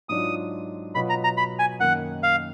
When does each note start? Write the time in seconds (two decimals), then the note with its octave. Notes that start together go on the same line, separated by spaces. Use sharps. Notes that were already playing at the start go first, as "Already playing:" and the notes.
0.09 G#2 F#3 D4 F4 D#6
0.95 B2 F#3 B3 F4 B5
1.09 A#5
1.24 A#5
1.37 B5
1.59 G#5
1.80 F#2 D#3 A#3 D#4 F#5
2.23 F5